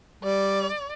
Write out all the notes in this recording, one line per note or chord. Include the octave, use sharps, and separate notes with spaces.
G3 D5